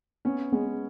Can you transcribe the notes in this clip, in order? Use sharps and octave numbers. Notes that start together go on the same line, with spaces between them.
B3 C#4
G#3 B3